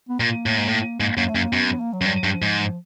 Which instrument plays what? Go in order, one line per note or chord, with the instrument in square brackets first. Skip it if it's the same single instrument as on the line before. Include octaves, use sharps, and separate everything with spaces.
[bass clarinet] B3
[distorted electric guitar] A#2 [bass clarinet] A#3
[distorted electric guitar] A2
G#2
A2
[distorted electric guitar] G#2 [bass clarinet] A#3
[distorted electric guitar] F#2 [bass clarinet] A#3
[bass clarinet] A3
[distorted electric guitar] F#2 [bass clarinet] A#3
[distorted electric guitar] F#2 [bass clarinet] B3
[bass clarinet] B3
A#3
F#3
[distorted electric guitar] F#2
[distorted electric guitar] G2 [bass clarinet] F#3
[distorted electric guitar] G2
[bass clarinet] F3
[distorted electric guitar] G#2
[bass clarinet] F3